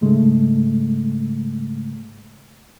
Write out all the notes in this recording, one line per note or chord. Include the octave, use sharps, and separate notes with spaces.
G#2 C#3 G#3 A3